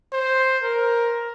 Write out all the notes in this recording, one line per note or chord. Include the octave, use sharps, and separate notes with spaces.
C5
A#4